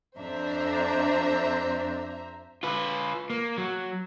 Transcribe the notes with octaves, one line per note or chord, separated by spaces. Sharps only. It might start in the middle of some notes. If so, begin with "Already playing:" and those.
F2 D4 C5 E5 A#5
F4 B4
A#3
F#3